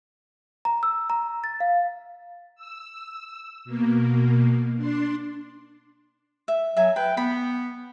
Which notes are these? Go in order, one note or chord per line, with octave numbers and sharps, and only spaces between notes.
A#5
E6
A#5
A6
F5
E6
B2 A#3
D4 C6
E5
F#3 E5 G#5
B4 G5
B3 B5